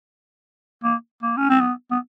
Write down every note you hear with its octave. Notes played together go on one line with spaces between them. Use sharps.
A#3
A#3
C#4
C4
B3
B3